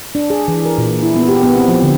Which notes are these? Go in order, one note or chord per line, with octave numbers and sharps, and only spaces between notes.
D4
G#4
E3
A#4
A#2
E4
B3
G4
B3
C4
F3
D3